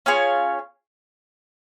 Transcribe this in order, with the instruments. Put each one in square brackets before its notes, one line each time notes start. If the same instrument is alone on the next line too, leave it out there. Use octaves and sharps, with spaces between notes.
[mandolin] C#4 F4 G#4 C#5